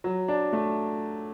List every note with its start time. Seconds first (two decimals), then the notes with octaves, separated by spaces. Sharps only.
0.04 F#3
0.28 D4
0.53 A3